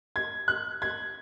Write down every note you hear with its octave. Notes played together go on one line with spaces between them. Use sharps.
G#6
F#6
G#6